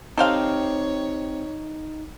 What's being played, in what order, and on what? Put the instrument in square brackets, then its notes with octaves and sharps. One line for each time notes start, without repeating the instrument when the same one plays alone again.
[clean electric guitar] C4 G4 [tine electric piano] D#4 [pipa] A4 C5 F5 [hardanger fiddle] C#5